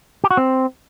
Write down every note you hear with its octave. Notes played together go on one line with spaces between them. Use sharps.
G4
F#4
C4